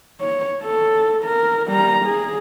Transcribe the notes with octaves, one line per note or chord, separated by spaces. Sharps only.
C#5
A4
A#4
G3 A#5
G#4